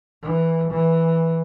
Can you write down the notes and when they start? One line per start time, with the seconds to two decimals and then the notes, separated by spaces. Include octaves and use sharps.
0.22 E3
0.70 E3